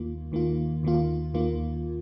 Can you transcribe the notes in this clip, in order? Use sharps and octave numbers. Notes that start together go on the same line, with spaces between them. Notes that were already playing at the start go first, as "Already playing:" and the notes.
Already playing: D#2 D#3 A#3 F4
D#2 D#3 A#3 F4
D#2 D#3 A#3 F4
D#2 D#3 A#3 F4